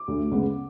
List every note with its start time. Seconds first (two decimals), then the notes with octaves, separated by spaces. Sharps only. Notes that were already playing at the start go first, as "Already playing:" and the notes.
Already playing: D6
0.08 D2
0.32 C#3 G#3 B3